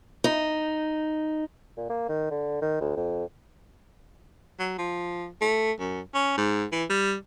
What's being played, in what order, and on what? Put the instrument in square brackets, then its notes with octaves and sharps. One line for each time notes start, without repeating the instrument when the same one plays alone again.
[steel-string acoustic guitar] D#4
[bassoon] A#2
A#3
D#3
D3
D#3
D2
F2
[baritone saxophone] F#3
F3
A3
F#2
C#4
G#2
E3
G3